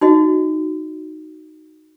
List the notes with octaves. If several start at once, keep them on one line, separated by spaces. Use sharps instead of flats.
D#4 F#4 D#5